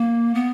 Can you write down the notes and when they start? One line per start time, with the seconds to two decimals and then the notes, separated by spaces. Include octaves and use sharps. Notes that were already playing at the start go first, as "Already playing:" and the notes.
Already playing: A#3
0.35 B3